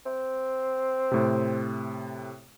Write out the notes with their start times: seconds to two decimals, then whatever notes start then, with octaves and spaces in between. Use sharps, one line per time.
0.06 C4
1.12 A2 C3